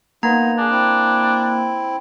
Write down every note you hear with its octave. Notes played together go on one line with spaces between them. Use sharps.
A#3 B3 D#4 A#5
D4 G#4
C4 E4